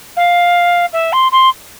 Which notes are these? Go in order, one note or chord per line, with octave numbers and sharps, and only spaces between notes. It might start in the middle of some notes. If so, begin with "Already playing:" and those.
F5
E5
C6
C6